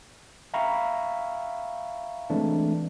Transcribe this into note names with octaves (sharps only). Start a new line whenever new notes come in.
E5 F5 G5 A#5 B5 C#6
E3 G#3 A3 C4 D4